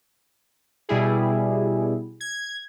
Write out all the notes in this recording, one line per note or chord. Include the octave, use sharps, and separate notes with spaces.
B2 G3 E4 G#4
G#6